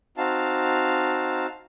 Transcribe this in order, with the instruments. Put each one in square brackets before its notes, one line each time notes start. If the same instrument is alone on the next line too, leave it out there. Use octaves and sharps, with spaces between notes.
[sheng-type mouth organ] C4 D#4 F#4 F5 A5